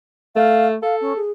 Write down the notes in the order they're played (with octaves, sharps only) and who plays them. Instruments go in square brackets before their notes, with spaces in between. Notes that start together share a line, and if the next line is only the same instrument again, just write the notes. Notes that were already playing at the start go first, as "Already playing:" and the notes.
[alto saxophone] A3 [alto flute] F5
[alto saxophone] A4 [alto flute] F5
[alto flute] C#4
G#4